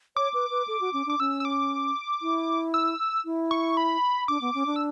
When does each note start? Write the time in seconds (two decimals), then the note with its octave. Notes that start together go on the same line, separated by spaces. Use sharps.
0.16 C#5 D6
0.34 B4
0.50 B4
0.68 A4
0.81 F#4
0.93 C#4
1.06 D4 D6
1.19 C#4 E6
1.40 E6
1.45 D6
2.22 E4
2.74 E6
3.25 E4
3.51 C#6
3.77 B5
4.28 D4 D6
4.41 B3
4.54 C#4
4.66 D4
4.76 E6